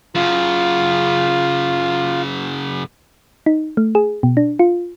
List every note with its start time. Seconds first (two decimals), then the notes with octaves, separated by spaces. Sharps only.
0.15 F#2 C#3 F4
3.46 D#4
3.77 A3
3.95 G#4
4.23 B2
4.37 D4
4.59 F4